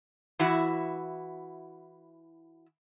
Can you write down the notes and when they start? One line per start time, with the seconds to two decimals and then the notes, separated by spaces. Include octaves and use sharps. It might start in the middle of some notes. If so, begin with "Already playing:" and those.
0.39 E3 E4 F#4